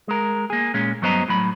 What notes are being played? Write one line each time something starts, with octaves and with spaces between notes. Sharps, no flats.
G#3 A#4
A#3 G#4
A#2 G#3 C#4
G2 F#3 B3 C5 D#5 A#5
A2 F#3 B5